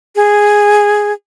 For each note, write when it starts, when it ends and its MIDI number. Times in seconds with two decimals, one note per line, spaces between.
0.16 1.12 68